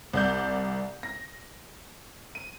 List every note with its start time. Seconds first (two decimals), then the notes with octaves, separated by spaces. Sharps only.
0.13 C2 D5 G6
1.03 A#6
2.35 D#7